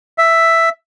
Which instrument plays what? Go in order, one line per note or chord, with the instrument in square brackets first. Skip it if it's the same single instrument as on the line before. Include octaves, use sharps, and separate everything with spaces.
[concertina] E5